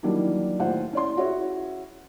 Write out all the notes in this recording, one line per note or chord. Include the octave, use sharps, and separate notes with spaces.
D#3 E3 F#3 G3 A#3 D4
D#2 A2 F4 C5 F#5
C#4 E4 C#5 D5 C6
C#4 E4 F#4 G#4 C#5 E5